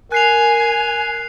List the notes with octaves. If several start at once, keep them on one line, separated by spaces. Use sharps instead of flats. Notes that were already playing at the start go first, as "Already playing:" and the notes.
A#4 G#5 F#6 C7 F7